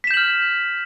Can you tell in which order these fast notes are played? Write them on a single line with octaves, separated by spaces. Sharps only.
B6 E7 G6 F#7 F6